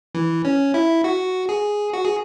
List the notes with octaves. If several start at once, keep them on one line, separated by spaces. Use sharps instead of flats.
E3
C#4
E4
F#4
G#4
F#4
G#4